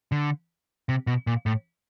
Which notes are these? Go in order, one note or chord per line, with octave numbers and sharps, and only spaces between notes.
D3
C3
B2
A#2
A2